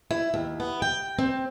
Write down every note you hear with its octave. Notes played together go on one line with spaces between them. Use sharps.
E4
D#2
B3
G5
C4